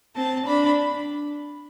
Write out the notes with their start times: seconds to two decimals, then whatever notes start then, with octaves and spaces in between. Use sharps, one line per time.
0.16 C4 A5
0.47 D4 B5